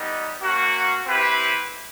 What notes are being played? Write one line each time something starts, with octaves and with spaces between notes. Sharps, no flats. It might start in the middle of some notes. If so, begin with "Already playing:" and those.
Already playing: G3 B3 D#4
A#3 C#4 F#4
C4 E4 G4 B4